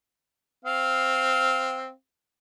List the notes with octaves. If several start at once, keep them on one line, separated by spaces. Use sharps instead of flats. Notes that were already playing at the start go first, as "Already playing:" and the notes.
C4 F5